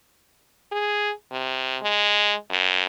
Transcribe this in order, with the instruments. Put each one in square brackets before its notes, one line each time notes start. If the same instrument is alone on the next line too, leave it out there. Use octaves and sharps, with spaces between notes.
[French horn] G#4
C3
G#3
F#2